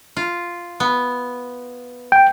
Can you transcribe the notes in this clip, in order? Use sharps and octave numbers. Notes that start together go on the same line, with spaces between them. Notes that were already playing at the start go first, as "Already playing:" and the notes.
F4
B3
G5